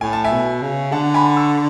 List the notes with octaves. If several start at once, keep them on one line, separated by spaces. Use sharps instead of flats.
A2 G#5
A5
E5 G#5
B2
C#3
D3 F#5 A5
G#5 B5
C#6 E6